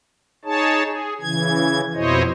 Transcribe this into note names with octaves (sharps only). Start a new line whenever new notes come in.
D#4 G#4 C#5 A5
G#4
C#3 E3 G#6
F2 B2 E4 C5 C#5 D#5